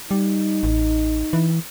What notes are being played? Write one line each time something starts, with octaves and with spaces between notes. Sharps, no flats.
G3 D#4
A1
E3